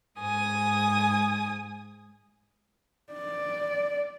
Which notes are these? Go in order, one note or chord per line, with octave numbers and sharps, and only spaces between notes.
G#2 G#5 D#6
D5